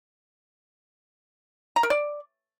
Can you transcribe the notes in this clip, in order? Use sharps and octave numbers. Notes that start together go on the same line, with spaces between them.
A#5
A#4
D5